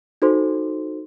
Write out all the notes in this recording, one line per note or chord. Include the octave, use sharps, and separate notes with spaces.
D#4 F#4 A4 C5 C6